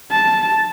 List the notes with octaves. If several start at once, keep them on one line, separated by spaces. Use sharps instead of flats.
A5